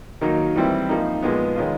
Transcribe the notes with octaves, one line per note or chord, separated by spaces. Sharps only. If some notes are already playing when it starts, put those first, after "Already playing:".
D#3 F#3 A#3 D#4
E3 G3 C4 E4
F3 A#3 D#4
A#2 F3 G#3 B3
D#3 G#3 C#4 F4